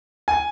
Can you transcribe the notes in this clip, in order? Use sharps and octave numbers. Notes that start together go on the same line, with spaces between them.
G#5